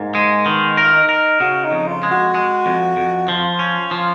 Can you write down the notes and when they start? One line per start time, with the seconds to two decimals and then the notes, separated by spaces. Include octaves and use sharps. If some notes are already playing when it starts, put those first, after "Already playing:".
Already playing: G#2 A#3
0.15 G#3
0.46 D#3 B3
0.77 F4 A#4
0.93 D#4
1.09 A#4
1.40 C#3 F#4
1.64 D#4
1.72 F2
1.87 F4
2.03 G#3
2.11 F#4
2.35 G#3
2.66 F2
2.97 F2
3.28 F3 F4
3.59 C#4
3.91 F3